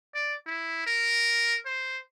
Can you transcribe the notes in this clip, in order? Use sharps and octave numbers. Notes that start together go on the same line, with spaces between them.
D5
E4
A#4
C5